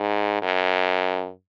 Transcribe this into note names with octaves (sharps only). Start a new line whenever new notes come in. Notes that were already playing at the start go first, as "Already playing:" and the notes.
Already playing: G#2
F#2